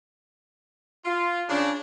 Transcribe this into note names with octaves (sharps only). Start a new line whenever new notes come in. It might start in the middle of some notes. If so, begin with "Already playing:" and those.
F4
C#3 D4